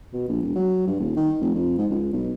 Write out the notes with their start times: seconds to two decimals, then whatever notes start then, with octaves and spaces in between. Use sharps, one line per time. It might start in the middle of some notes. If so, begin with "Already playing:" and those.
0.13 B2
0.28 A#1
0.42 E1
0.55 F#3
0.87 G2
1.00 D#1
1.17 D#3
1.41 F1
1.55 F2
1.78 G#2
1.90 C#2
2.13 B1